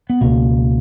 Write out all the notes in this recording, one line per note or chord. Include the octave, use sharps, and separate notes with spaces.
B3
C#2 B2 A#3